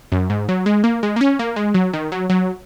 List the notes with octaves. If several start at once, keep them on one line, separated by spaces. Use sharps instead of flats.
F#2
G#2
F#3
G#3
A#3
G#3
A#3
C#4
A#3
G#3
F#3
D#3
F#3
F#3